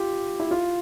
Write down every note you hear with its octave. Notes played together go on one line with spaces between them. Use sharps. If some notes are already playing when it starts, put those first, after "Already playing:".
Already playing: F4 G4
E4
F4